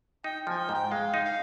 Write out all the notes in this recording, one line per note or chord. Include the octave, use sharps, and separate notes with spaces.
D#4 G5
F3 G#5
G5
G#2
G5
G#3 F5
D#4
F5